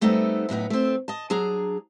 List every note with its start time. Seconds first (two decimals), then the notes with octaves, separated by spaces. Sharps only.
0.01 G3 A3 B3 C4 D#4 A4
0.49 F#2 A2 B3 D#4
0.70 A3 C4
1.08 D#5 A5
1.30 F#3 D4 G#4 A#5